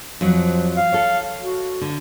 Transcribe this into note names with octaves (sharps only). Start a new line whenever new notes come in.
F2 F3 F#3
F5
A4 C#5
F#4
D3